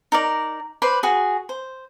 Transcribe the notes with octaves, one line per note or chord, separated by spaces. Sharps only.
D#4 A#4 D5
B4 C5 D5 B5
F#4 G#4
C5